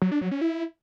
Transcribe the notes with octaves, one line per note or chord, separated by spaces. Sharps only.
F#3
D4
F#3
C#4
E4